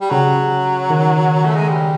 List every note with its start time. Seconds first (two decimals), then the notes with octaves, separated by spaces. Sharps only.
0.01 G3
0.10 C#3 F#3
0.90 D#3
1.45 A3
1.56 G#3
1.69 G3